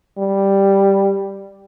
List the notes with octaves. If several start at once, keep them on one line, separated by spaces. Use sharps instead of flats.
G3